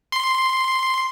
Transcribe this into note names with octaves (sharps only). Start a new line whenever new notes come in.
C6